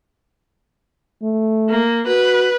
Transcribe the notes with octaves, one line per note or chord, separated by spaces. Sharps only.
A3
A#3
F#4 B4